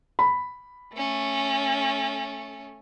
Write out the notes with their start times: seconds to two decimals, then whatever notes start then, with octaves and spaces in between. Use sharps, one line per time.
0.19 B5
0.95 A3 C#4